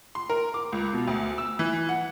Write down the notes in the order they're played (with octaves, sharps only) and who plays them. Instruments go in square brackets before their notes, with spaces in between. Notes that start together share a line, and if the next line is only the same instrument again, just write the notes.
[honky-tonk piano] C6
A#4
D6
C#2
B2
D2
E6
E3
F#5